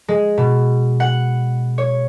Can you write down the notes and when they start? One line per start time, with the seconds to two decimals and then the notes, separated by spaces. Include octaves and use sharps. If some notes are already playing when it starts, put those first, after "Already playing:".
0.08 G#3
0.38 B2
1.00 F#5
1.78 C#5